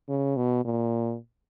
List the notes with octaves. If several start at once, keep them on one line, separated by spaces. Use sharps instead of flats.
C#3
B2
A#2